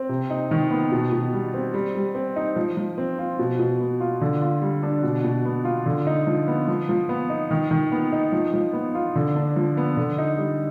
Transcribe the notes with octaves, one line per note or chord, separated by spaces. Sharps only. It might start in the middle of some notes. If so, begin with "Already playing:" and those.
Already playing: C4
C3
D#4
D#3
B3
B2
B2
G3
C4
G3
G3
C4
D#4
F3
F3
C4
F4
B2
B2
B3
F4
D3
F4
G3
D4
B2
B2
B3
F4
D3
D#4
F3
B3
F3
F3
B3
D#4
D#3
D#3
B3
D#4
F3
F3
B3
F4
D3
D4
F3
B3
D3
D#4
G3